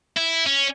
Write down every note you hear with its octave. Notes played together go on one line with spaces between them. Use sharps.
E4
C#4